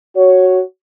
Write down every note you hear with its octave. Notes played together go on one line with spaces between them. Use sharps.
F#4 C#5